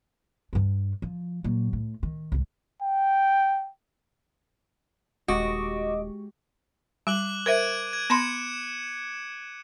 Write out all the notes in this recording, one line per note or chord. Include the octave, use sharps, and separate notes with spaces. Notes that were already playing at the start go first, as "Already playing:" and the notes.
G2 D4
F3
A#2 F#3
A2
D#3
C2 G#2
G5
D#1 G#3 F#4 G4 D#5 D6
G3 D6 F#6 F#7
A#4 C5 E5 G#6 D7 D#7
G#6
B3 B5 C6 C#7 E7